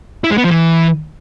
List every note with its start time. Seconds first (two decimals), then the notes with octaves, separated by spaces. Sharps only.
0.24 E4
0.31 G#3
0.38 B3
0.44 F3
0.51 E3